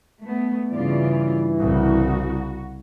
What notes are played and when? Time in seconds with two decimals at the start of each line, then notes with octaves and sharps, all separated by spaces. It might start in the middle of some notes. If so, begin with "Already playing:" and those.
0.23 A3 B3
0.71 G2 C#3 E3 F4 D5
1.59 C2 C#3 F#4